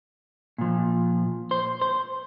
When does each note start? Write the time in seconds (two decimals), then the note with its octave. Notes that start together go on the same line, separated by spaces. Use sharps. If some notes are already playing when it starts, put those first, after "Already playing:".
0.58 A#2 F3
1.51 C5
1.82 C5